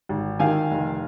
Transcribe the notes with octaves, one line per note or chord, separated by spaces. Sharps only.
G#1
D#3 F5 G#5
F1